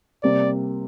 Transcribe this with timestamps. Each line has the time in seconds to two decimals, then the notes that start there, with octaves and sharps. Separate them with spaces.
0.23 C3 G3 A#3 D5